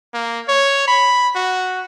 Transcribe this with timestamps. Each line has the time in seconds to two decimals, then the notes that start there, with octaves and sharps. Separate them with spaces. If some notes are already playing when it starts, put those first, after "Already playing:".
0.14 A#3
0.48 C#5
0.88 B5
1.35 F#4